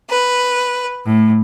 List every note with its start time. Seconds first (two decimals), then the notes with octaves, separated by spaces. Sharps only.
0.10 B4
1.06 A2